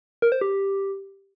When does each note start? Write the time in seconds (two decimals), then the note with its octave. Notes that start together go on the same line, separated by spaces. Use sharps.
0.22 A#4
0.32 C5
0.41 G4